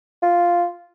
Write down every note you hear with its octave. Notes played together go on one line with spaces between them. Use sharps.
F4